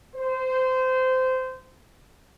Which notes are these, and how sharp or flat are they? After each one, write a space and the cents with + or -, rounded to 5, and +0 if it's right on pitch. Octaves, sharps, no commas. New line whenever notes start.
C5 -20